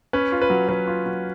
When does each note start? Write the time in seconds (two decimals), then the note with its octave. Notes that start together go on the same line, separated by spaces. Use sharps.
0.13 C#4 B4
0.32 F4
0.42 B4
0.50 F#3
0.69 F#3 B4
0.87 F4
1.06 F#3